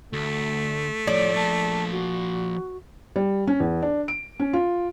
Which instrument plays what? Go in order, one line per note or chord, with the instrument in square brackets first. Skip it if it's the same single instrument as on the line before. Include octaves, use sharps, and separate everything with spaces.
[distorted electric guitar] D2 [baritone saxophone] A3
[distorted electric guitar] A2 F3 [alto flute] C#5 [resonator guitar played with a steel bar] D5
[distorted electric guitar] F3 A#3 [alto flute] A5
[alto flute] F#4
[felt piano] G3
C#4
E2
D4
D7
C#4
F4